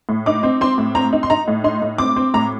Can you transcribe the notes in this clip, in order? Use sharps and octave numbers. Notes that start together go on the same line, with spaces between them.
A2
D#4 D6
C4
C4 C6
A2
C4 A#5
D#4
C6
D#4 A#5
A2
D#4 C6
A2
C4 D6
C4
A2 A#5